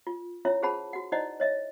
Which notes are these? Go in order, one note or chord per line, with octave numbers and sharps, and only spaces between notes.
F4
C#4 E4 F4 C#5 E5
G#4 C5 F#5 A5 B5
F#4 F#5
D#4 E4 C5 D5 D#5 F#5
C#5 D#5 E5